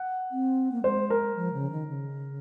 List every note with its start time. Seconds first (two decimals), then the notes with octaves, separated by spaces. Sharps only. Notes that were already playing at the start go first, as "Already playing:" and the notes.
Already playing: F#5
0.31 C4
0.72 A#3
0.84 G#3 C5
1.10 A#4
1.36 F3
1.53 C#3
1.71 D#3
1.88 C#3